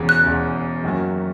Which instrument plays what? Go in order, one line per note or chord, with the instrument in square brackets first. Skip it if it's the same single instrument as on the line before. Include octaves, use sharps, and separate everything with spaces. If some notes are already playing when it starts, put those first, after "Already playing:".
Already playing: [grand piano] E1 E2 C#3
[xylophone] F#6
[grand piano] E1 E2 C#3
F#2 D#3 A#3 C#4 F#4